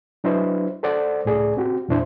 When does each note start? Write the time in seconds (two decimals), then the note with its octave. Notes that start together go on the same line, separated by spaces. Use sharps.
0.24 F#3 D4 E4 B4 C5 D#5
0.83 A4 C5 D5 F#5
1.25 C#2 A2 G#4 D5
1.57 C4 F#4 G4
1.89 E2 A#2 D4 E4 C5